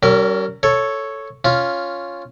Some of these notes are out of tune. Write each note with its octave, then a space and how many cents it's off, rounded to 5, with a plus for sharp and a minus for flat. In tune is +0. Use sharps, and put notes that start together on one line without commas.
G3 -40 C#4 +10 A#4 -15
A4 +0 C#5 +0
C#4 +0 F4 +0